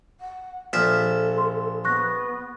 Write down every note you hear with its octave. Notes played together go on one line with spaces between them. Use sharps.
F#5
A#1 A4 E5 F6
C6
B3 C#6 F#6 A#6